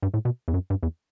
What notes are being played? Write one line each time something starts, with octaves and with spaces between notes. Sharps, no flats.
G2
A2
B2
E2
F#2
G2
E2